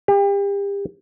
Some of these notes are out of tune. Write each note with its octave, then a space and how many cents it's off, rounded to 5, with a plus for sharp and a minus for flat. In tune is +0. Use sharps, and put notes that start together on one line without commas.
G4 +35